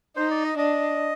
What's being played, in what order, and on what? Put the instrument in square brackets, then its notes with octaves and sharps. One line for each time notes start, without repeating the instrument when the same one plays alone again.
[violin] D#4 [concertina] C5
[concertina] D5
D#5
[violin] D4 [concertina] D#5